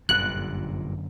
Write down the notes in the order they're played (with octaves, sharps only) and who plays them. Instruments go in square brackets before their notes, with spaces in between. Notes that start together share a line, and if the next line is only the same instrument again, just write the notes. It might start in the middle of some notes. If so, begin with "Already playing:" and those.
[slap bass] G1 A#2 [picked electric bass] F#2 D3 [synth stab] F#6